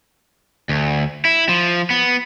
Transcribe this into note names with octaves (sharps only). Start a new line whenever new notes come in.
D2
E4
F3
B3